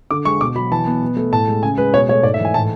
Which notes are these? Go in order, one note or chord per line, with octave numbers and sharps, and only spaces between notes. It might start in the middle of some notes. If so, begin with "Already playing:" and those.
D3 D6
G#3 C#6
B2 D6
F#3 B5
E3 A5
B3
B2
A3
A2 A5
G#3
C#3 G#5
G#3 B4
B2 C#5
A3 C#5
G#2 D5
E5
E3 G#5
A2 A5